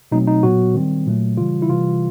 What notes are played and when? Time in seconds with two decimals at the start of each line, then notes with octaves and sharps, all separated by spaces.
0.12 B2 F#3 A3 C4 D#4
0.27 D#4
0.43 A#2 F#3 B3 F#4
0.74 D#3 G3 C4
1.06 A#2 F#3 A3
1.37 C#3 E3 G3 F4
1.62 E4
1.69 C3 E3 G3 F4